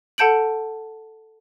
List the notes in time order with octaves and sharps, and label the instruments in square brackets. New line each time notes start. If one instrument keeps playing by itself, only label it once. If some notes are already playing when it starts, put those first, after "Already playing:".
[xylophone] A4 F#5 A5 G6 D7 F#7